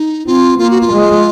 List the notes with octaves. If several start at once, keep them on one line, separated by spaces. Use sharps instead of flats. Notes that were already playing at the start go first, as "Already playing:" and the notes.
Already playing: D#4
C4 F4
A#3 F4
F#4
F4
G#3